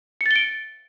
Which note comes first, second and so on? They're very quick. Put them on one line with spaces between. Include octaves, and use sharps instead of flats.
C#7 A6 G7 D7